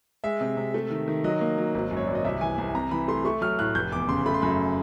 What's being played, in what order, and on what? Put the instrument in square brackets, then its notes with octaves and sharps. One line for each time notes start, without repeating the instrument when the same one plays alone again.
[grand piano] G#3 E5
C3
C3
A3
D#3
D#3
F#3 D#5
A#3
F#3
G#1
F#2
C#5
G#1 D5
D#5
C2 E5
E3 G#5
C2
C3 A#5
E3 B5
A3 C6
A3 C#6
F#3 F6
A2 F#6
F1 G6
E2 D6
C#3 C6
A3 B5
C6
F#2 B5